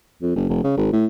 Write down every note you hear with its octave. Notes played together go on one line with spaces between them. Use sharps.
F2
F#1
F1
C#3
G#1
A2